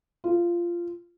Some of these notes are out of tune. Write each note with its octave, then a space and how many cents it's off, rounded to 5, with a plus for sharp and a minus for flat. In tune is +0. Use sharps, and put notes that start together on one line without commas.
F4 -15